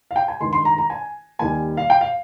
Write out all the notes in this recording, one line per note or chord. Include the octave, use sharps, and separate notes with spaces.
F5
G5
G#5
G2 D#3 G#3 C6
C6
A#5
A#5
G#5
D#2 D#3 G3 G#5
F5
G5
F5